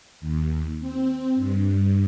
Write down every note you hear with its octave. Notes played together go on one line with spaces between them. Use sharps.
D#2
C4
G2